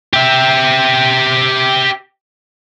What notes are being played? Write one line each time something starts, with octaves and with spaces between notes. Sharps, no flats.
G4 E5